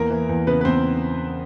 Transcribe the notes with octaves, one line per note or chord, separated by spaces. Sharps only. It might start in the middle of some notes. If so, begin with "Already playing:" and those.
Already playing: E2 A#3 A#4
E3
E2
C#3 B3 B4
B4
E2 C4 C5